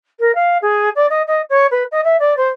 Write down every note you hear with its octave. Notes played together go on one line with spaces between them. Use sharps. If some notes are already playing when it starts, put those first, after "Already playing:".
A#4
F5
G#4
D5
D#5
D#5
C#5
B4
D#5
E5
D5
C5